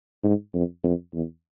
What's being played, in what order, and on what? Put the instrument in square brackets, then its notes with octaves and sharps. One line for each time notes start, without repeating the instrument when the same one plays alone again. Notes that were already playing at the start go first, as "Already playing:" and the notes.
[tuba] G#2
F2
F2
E2